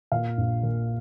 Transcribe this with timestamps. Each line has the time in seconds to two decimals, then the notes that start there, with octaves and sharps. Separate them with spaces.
0.12 A#2 F5
0.38 A#1
0.63 A#2